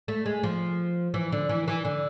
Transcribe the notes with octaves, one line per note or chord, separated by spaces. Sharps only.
A3
G#3
F3
E3
D3
E3
E3
D3